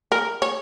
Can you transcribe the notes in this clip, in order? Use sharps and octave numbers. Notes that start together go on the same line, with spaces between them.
A#4
C#5